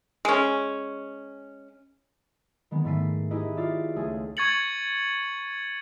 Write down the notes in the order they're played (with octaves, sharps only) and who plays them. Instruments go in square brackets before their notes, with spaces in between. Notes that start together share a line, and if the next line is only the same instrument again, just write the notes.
[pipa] G#3 C#4
[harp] D#3 G#3 B3
G#2 D#3 A3 B6 C7 D#7
D#4 E4 G4 G#4 B4 D#5
F4 D5 E5
C#2 A3 G#4
[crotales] C#6 G#6 A6 C#7 F#7